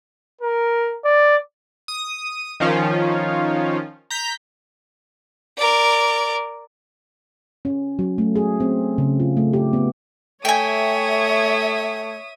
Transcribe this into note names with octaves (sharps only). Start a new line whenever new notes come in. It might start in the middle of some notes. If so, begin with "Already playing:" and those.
A#4
D5
D#6
D#3 F3 C#4 F4
A#5 G6 B6
A#4 D5
C#4
F#3
A3
G#4
C4
C#3
F4
A3
G4
B3
A3 C#5 E5 G5 G#5 D#6